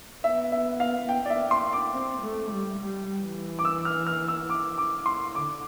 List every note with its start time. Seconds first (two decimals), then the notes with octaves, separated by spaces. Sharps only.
0.24 B3 E5
0.52 E5
0.80 F5
1.09 G5
1.25 D5
1.30 E5
1.51 C6
1.73 D6
1.94 C4
2.22 A3
2.51 G3
2.80 G3
3.22 E3
3.59 D6
3.65 E6
3.85 F6
4.07 F6
4.28 E6
4.50 D6
4.78 D6
5.06 C6
5.35 D3 D6